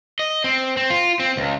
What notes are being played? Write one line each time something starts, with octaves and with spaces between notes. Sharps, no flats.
D#5
C4
C4
F4
C4
C#2